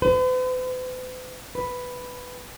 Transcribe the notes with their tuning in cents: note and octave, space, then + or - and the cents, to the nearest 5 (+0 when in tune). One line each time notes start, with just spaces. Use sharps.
B4 +45
B4 +5